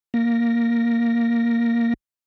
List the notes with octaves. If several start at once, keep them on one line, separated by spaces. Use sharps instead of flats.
A#3 A#6